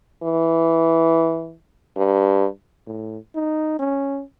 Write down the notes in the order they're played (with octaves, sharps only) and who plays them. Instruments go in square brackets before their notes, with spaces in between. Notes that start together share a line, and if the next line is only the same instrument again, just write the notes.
[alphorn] E3
G2
[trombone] A2
D#4
C#4